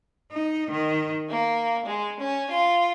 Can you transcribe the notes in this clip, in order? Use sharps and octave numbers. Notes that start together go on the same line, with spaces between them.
D#4
D#3
A#3
G#3
C#4
F4